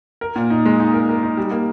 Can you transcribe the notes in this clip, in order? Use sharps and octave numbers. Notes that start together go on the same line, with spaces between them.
A#4
A#2
D#4
G#3
D#4
A#4
A#4
D#4
G3
A#3